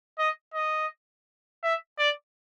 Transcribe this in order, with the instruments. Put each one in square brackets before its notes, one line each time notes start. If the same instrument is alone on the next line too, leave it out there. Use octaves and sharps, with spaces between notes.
[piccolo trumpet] D#5
D#5
E5
D5